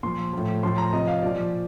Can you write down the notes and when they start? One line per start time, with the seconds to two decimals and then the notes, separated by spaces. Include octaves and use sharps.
0.03 A#2 F3 C6
0.33 A2 F3
0.63 A2 F3 C6
0.78 A#5
0.93 C3 F3 D#5
1.07 F5
1.22 A#2 F3 D5